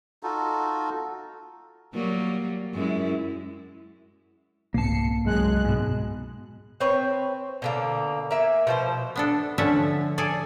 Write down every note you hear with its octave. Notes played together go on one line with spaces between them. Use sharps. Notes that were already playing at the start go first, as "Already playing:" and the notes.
D#4 F4 F#4 A4
F#3 G3 A#3
F#2 G#3 E4
C2 G#2 B2 A#3 A5 C7 C#7
C2 F#2 F#3 G#3 F#6
G#2 B2
C4 B4 C#5
B2 D3 A#3
A#3 E5 G#5
B2 F3 C5
B3 D4 A4
D3 F3 C#4 A4 E5 F#5
G#4 A4 D5